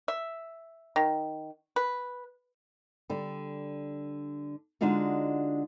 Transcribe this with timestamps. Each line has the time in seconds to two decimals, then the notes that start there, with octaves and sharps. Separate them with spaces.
0.08 E5
0.96 D#3
1.76 B4
3.09 D3 G3
4.81 D3 G#3 D4 D#4 F4 F#4